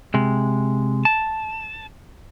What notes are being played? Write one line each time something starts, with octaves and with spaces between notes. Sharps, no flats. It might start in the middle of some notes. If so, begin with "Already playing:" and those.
C3 G#3
A5